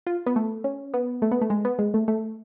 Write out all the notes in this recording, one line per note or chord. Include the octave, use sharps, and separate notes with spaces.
F4
B3
A3
C#4
B3
A3
B3
A3
G#3
B3
G#3
A3
A3